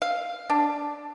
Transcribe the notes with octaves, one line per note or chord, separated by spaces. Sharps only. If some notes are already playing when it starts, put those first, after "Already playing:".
F5
D4